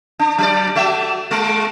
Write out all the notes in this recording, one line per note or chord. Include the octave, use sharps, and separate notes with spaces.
D4
F#3 D5
A3 F#4 E5
G#3 A3